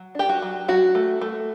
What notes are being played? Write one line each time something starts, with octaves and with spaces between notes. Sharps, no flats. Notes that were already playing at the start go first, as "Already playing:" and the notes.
Already playing: F#3
D4 G4
F#4
F#3
F#3 F#4
A3
A3